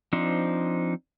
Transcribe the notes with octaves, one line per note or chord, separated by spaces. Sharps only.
F3 C4 D4 D#4